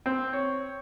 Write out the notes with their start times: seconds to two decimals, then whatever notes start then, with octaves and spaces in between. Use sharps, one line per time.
0.06 C4
0.33 C#5